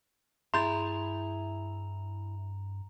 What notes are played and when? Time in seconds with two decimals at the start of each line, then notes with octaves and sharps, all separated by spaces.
0.54 G2 E4 G#4 A#5 C6 G6 A6 F7